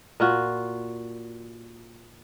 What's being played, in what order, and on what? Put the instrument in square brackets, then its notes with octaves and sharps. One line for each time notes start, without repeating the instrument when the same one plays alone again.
[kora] A#2 F4 F#4